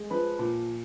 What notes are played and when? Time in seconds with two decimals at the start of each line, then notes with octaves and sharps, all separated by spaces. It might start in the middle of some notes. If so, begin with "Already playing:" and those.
Already playing: G#3
0.10 F3 B4 B5
0.39 A#2